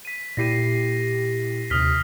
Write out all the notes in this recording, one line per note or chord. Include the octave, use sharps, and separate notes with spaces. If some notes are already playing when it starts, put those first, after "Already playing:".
B6 D#7
A#2 E4 G4 A#6 C7 D#7
D#2 C3 D#6 F6 B6